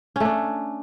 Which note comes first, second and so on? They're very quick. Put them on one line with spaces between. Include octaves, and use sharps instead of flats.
C#4 A3 D4